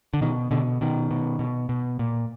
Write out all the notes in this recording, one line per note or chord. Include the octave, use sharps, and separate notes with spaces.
D3
B2 D#3
B2 D3
B2 D#3
B2
B2
B2
A#2